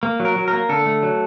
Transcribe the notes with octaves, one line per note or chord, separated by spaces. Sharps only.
A#3
F#3
A#4
F#3
A#4
A#3
D3 A4
A3
F#3